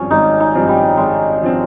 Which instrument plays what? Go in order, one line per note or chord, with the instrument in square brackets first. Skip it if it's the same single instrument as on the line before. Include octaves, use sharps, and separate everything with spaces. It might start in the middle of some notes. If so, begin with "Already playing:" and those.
Already playing: [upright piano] G#1 G2 F3 C4 [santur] C#4
[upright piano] G#1 [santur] D#4
[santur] D#4
[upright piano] G2 F3 C4
[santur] G3
[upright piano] G#1 [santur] G#3
[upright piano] F3 C4